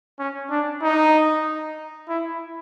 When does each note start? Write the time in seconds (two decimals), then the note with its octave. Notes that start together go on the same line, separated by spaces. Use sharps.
0.19 C#4
0.50 D4
0.83 D#4
2.09 E4